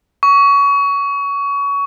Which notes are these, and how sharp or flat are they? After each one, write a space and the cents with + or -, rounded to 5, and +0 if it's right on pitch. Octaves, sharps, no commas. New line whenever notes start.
C#6 +25